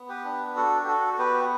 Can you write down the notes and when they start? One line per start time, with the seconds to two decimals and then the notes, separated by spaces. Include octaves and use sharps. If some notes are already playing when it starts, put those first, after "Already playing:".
Already playing: B3
0.09 G4 B4
0.25 D4
0.56 F#4 A4
0.83 G4
0.87 F#4 A4
1.18 B3 G4 B4